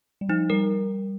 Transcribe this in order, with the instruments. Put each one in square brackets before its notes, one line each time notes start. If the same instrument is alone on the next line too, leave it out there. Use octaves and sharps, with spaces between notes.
[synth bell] G3
[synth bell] F3 [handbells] D#4
[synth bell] G3 [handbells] A#4